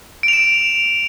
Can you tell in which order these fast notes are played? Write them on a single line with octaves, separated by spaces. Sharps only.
D7 F7 E7